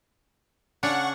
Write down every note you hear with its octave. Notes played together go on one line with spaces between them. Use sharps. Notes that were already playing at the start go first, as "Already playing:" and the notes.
C#3 D4 C#5 F#5 C#6